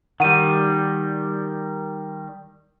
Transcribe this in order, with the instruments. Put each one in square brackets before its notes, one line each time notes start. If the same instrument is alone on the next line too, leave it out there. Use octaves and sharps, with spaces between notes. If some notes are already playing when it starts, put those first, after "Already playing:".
[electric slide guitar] D#3 G3 [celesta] F#5 D#7